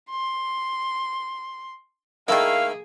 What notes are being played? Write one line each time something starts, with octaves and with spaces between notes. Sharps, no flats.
C6
D#3 A3 A#3 E4 G#4 F5